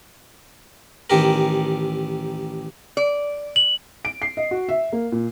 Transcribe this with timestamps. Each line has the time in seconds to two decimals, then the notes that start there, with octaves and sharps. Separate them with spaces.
1.10 A1 D#3 G4 A#4
2.97 D5
3.56 F#7
4.05 D7
4.22 C7
4.37 D#5
4.51 F#4
4.69 E5
4.93 A#3
5.12 A#2